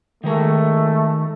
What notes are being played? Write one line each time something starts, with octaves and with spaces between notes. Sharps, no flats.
D#3 G#3 A3 A#4